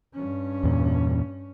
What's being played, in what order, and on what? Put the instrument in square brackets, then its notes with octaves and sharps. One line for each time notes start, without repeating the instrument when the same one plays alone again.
[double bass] G2 C#4
[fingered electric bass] E2 A#2